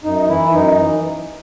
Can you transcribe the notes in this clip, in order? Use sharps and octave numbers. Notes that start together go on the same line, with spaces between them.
F#2 D#4
E3 E4
F#2 D#4
E3